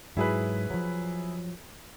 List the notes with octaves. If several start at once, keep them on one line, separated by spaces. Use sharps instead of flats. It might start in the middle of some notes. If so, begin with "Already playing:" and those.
G#2 F#3 E4 G#4 B4
F3 F#3